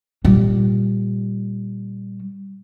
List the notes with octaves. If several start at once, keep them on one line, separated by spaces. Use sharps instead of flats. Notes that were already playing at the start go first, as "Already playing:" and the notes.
A#2 G3